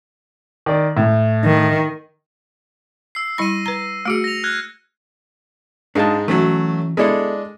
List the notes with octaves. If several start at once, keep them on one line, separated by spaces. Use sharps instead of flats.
D#3 D5
A2
D#3
E6 C7
G3 E4 B5 A#6 D#7
B4 A#5
A3 F#4 G#4 E6 C#7
A#6 F7
F6 F#6 G#6
G#2 G#3 D4 F5 A5
E3 F#3 A3 C#4
G#3 B3 D4 E4 A4